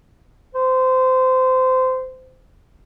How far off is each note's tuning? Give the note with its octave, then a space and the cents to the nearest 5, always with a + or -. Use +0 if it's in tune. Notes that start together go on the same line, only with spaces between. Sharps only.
C5 -20